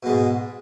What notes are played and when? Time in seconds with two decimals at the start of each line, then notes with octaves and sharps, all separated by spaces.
0.03 B2
0.06 G#3
0.09 G#2